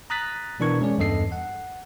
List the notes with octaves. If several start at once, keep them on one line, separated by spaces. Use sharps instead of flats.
A#5 D#6 F#6 A6 B6
B2 E3 D4 A#4 C#6 G#6
G#3 C#4 G#4 D5
E2 G2 A4 D#5 C7
F#5